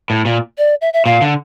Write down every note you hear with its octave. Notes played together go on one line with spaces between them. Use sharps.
A2
A#2
D5
E5
E5
A#2 F5
D3